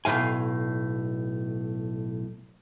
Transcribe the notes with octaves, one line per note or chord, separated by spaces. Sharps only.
B1 A2 C3 F5 G#5